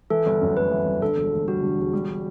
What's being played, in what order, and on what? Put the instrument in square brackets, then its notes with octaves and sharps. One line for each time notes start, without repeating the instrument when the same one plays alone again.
[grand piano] E3 [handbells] A4
[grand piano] G1
F#2
[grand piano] A3 [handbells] B4
[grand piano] E3
G1
[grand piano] D3 [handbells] A4
[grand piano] E1
D2
[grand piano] G3 [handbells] F#4
[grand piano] D3
E1
G3